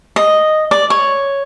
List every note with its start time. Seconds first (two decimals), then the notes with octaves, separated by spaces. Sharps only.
0.16 D#5
0.71 D5
0.90 C#5